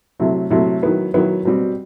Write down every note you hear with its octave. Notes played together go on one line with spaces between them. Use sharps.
C3 F#3 A3 E4
C3 F#3 A3 E4
D#3 F#3 B3 E4
D#3 F#3 B3 E4
B2 G3 C4